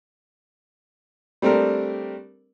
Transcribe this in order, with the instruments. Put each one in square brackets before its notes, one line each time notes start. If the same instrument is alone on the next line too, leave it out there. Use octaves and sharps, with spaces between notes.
[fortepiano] G3 A3 C4 D4 A#4